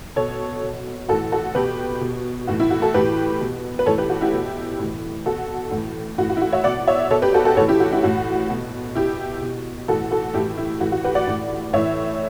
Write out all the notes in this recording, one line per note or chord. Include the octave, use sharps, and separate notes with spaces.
B2 A4 C#5
B2
A2 E3 F#4 A4
F#4 A4
B2 G4 B4
B2
A2 E3 F#4
E4
F#4
F#4 A4
A2 E3 G4 B4
B2
B4
A2 E3 A4 C#5
G4 B4
F#4
E4 G4
B2
A2 E3
B2 F#4 A4
A2 E3
A2 E3 F#4
F#4
E4
F#4
C#5 E5
B2 D5 F#5
C#5 E5
B2 A4 C#5
G4 B4
F#4 A4
F#4 A4
A2 E3 A4 C#5
E4 G4
F#4
E4 G4
A2 E3 F#4
B2
B2 E4 G4
B2
A2 E3 F#4 A4
F#4 A4
A2 E3 E4 G4
E4
A2 E3 F#4
F#4
G4 B4
D5 F#5
A2 E3
A2 E3 C#5 E5